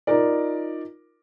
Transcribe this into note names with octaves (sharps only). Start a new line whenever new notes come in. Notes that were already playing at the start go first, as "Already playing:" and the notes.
D#4 F4 A#4 D5